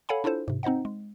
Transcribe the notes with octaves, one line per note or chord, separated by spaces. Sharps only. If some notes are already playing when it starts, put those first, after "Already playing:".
A4 C#5 F5 F#5 G#5 B5
D4 E4 F4 A4 C5
G#2 C3
C4 D#4 C5 D#5 F#5
G#3